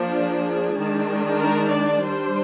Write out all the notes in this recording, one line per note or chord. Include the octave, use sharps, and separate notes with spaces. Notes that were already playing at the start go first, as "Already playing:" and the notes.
Already playing: F3 A#3 D4
G#4
D#3 G#3 D4
A#4
D5
G3 D4 C5